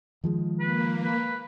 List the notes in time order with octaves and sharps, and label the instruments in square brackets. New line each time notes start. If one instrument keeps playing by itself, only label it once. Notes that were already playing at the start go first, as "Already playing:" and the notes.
[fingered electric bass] D#3 F3 G#3
[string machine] A#3 [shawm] B4
[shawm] B4